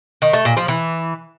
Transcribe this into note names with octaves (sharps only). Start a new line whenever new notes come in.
D#3
A3
A#2
F3
E3